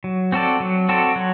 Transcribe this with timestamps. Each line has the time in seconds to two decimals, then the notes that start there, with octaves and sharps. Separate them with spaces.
0.04 F#3
0.32 C4 F#4 A4 D5
0.60 F#3
0.89 C4 F#4 A4 D5
1.16 F#3